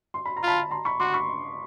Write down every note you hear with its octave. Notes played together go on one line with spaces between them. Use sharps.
C6
B5
A#5
F4 A5 B5
A#5 C6
B5 C#6
F#4 C6 D6
B5 C#6